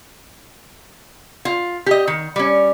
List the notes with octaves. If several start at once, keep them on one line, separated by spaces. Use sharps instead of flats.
F4
G4 D#5
D#3
G3 C#4